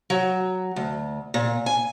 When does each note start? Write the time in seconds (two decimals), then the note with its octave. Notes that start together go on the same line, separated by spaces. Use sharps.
0.10 F#3
0.76 D2
1.34 A#2
1.66 G#5